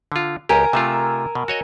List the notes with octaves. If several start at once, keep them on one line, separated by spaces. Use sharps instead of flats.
D3 F4
C#2 G4 A#4 G#5 A#5
C3 A3 F4 E6
B2
F#4 C#5 D#5